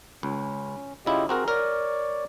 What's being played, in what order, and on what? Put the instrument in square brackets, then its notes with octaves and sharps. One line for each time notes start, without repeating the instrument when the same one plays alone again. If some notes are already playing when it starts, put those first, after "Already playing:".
[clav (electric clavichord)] C#2 [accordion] C#4
[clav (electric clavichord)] C#3 E4 [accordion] F4 G4 D#5
[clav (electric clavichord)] C4 F#4 A#4 [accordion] G#4 A#5
[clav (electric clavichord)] A#4 [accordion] C#5 D5